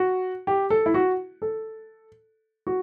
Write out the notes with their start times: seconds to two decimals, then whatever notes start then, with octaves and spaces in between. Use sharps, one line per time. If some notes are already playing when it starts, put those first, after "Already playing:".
Already playing: F#4
0.47 G4
0.70 A4
0.86 E4
0.94 F#4
1.42 A4
2.67 F#4